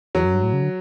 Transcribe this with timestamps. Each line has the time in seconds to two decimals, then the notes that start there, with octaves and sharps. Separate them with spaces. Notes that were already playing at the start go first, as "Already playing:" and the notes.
0.15 E2 F#3
0.24 F#2
0.34 G2
0.43 A2
0.53 C#3
0.62 D3